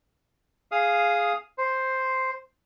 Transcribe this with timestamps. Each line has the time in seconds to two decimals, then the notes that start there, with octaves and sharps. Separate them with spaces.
0.72 G#4 F5 D#6
1.58 C5